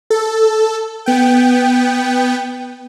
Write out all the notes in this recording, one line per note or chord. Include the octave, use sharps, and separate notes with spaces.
A4
B3 G5